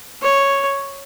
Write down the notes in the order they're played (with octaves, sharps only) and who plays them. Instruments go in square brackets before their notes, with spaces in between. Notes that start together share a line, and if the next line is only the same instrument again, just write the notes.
[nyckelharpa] C#5